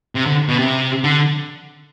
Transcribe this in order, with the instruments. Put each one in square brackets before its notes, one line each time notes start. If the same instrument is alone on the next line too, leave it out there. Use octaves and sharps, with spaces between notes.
[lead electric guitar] C3
D3
B2
C3
D3